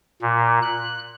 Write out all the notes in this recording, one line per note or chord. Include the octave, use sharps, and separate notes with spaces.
A#2
F#6